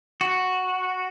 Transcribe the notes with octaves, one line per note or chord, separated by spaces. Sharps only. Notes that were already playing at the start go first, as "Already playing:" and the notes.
F#4